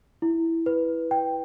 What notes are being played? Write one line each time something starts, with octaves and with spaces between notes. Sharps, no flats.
E4
B4
G5